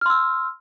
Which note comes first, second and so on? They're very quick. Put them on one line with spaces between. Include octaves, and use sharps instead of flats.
F6 C6 E6